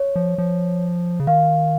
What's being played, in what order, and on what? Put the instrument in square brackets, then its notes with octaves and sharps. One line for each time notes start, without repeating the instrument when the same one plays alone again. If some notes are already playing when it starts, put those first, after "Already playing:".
Already playing: [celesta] C#5
[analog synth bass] F3
F3
C#3
[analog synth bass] D#3 [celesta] F5